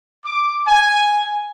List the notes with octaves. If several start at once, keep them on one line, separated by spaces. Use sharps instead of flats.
D6
G#5